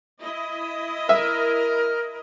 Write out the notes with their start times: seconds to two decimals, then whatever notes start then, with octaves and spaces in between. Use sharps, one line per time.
0.21 E4 D#5
1.09 A#4 E5